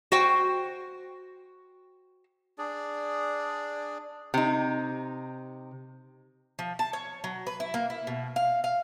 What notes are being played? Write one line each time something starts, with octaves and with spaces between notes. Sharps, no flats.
F#4 C5 G5
D4 G#4 D5
C3 D#4
F3
A5
C#5
F#3
B4
E4
A#3
E4
B2
F5
F5